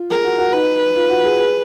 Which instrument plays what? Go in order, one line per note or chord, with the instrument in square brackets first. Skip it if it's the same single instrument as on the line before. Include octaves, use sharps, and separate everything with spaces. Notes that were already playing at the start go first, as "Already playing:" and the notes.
Already playing: [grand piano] F4
[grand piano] G#4 [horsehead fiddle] A#4
[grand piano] F#4
F#4
[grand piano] D#4 [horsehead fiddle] B4
[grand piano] F4
F#4
G#4
G#4